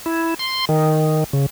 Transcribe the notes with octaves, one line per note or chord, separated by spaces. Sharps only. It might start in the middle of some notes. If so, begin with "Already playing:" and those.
E4
C6
D#3
C#3